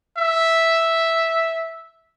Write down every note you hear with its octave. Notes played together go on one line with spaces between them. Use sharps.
E5